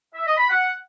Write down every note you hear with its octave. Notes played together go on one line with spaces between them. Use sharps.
E5
D#5
B5
F#5